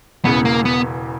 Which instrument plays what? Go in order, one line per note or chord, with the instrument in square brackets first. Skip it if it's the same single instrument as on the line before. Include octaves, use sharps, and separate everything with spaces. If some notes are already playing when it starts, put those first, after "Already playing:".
[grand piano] E1 E2 C#3 [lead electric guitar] B3
[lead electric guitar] A#3
B3